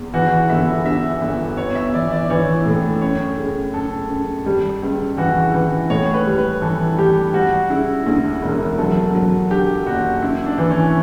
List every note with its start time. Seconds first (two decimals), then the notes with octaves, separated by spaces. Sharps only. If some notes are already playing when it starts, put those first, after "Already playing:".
Already playing: E2
0.14 E3 F#4
0.50 G1 E5
0.85 G2 E5
1.21 G1
1.57 B3 C#5
1.75 E5
1.94 E3 D5
2.12 D5
2.30 E3 C#5
2.66 A2
3.01 F#2 C#5
3.38 C#3
3.74 F#2 A4
4.10 F#2
4.46 G3
4.82 C#2
5.17 E3 F#4
5.54 E3
5.90 A2 C#5
6.14 B4
6.26 G3
6.38 B4
6.62 E3 A4
6.97 G3 G4
7.34 G3 F#4
7.70 C#3 E4
8.06 D2 E4
8.42 E1
8.78 F#3 A4
9.15 F#3
9.50 D3 G4
9.86 F#1 F#4
10.23 F#2 E4
10.46 D4
10.58 E3
10.70 C#4